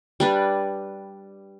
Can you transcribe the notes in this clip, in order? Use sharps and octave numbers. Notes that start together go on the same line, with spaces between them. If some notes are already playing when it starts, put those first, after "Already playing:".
G3 D4 B4